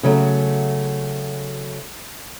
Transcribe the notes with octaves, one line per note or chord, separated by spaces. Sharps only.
C#3 F#3 A3 F#4